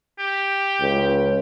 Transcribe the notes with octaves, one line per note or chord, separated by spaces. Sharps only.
G4
C#2